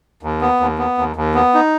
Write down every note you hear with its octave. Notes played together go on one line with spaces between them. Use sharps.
D#2
B3
D#2
B3
D#2
D#2
B3
D#4